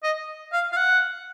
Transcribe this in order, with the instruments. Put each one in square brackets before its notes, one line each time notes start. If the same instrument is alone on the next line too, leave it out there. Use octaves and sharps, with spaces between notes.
[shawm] D#5
F5
F5
F#5